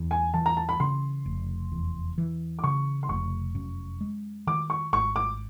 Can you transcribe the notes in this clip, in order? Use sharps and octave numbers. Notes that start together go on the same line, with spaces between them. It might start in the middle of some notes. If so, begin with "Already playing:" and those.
Already playing: E2
G#5
E3 A5
A#5
A5
B5
C#3 C6
F1
E2
E3
D6
C#3 C#6
C6
F1 C#6
F#2
G#3
D#3 D6
C#6
G#1 C#6
D6